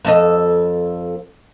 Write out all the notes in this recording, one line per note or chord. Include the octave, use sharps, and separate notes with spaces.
F2 A4 D#5